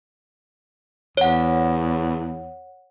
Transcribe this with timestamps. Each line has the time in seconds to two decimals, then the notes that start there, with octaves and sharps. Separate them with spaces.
1.17 E2 C#5 F#5